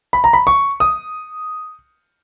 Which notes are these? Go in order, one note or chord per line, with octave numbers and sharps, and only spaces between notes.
B5
A#5
B5
C#6
D#6